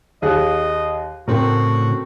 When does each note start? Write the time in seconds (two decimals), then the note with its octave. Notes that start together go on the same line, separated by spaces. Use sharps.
0.22 D#2 G#4 D#5 F#6
1.28 A2 C#3 A3 C4 F#4 A#4